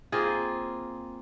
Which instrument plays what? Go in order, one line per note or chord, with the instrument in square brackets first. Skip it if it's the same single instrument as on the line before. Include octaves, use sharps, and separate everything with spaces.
[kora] A#3 C4 F4 G#4